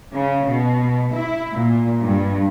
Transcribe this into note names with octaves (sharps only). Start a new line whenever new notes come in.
C#3
B2
E4
A#2
G2